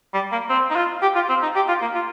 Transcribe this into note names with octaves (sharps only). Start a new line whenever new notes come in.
G3
A#3
C4
D#4
F4
G4
F4
C4
D#4
G4
F4
A#3
F4